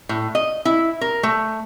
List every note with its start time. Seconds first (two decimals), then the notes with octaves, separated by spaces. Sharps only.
0.09 A2
0.35 D#5
0.65 E4
1.01 A#4
1.23 A3